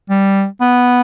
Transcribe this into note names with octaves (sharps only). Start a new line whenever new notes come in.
G3
B3